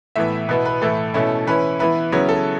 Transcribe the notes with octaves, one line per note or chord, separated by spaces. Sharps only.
A2 E3 B3 E5
B2 B3 E4 B4
B4
A2 E3 A3 E4 A4
B2 A3 C#4 E4
E3 C#4 E4 B4
E3 B3 E4 B4
C#3 F#3 B3 E4 C#5
A4